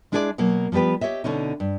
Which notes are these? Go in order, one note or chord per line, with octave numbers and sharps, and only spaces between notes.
G#3 D4 E4 G#4 C5 D5
B2 F#3 A#3
F3 G3 B3 G4 B4
G4 C#5 D#5 E5
B2 D3 C#4 D#4
G2